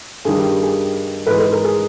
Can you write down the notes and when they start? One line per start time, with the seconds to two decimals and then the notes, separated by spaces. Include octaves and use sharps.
0.25 G2 D#3 G3 G#4
0.38 G4
0.51 G4
0.63 G#4
1.27 G#2 E3 G#3 B4
1.40 B4
1.52 A#4
1.64 G#4